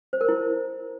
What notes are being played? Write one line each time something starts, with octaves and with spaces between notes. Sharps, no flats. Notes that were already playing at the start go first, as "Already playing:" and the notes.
C5
A#4
E4